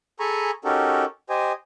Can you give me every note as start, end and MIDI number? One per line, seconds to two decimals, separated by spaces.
0.20 0.51 68
0.20 0.51 69
0.20 0.51 80
0.20 0.51 82
0.20 0.51 83
0.20 0.51 85
0.65 1.05 61
0.65 1.05 63
0.65 1.05 66
0.65 1.05 67
0.65 1.05 69
0.65 1.05 70
1.30 1.52 67
1.30 1.52 72
1.30 1.52 75
1.30 1.52 80